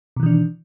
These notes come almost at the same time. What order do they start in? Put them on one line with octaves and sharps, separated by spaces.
B2 D#3 E3 D4